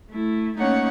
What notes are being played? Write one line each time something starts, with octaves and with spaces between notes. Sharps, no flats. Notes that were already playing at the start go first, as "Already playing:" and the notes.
A3 E4
A3 A#3 C#4 D#4 C#5 F#5